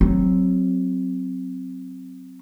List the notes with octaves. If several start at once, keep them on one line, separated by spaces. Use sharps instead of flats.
F#3 C4